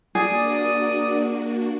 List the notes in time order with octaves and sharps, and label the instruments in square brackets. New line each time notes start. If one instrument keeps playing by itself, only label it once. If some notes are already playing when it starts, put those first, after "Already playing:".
[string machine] A#3 D4 F#4 [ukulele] G#4 [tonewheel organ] D5 D#6